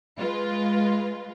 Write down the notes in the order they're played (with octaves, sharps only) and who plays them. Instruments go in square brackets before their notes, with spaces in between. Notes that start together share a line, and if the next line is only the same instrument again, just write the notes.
[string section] G#3 F4 B4